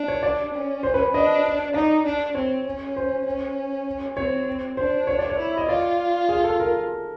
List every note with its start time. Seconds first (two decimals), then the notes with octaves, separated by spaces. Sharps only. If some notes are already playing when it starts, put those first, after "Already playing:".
Already playing: D4
0.08 C#5
0.23 D5
0.54 C#4
0.83 C5
0.94 B4
1.14 D4 D#5
1.74 D#4 D5
2.05 D4
2.35 C4 C#5
2.66 C#4
2.96 C5
3.26 C#4
4.17 C4 C#5
4.77 D4 C5
5.07 C#5
5.19 D5
5.30 C#5
5.38 E4
5.57 D#5
5.68 F4 D5
6.29 G#4
6.44 A4
6.60 A#4